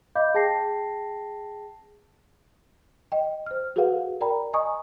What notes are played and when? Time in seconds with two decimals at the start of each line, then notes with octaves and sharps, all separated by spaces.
0.15 D#5 F5 B5 D6 G6
0.34 G#4 G5 A5 A#6 C7
3.12 D#5 G5
3.46 C5 F6
3.76 F#4 G#4 A4 B4 F5 F#5
4.21 A#4 D5 G5 A#5 B5
4.53 D#5 G#5 A#5 C#6 D#6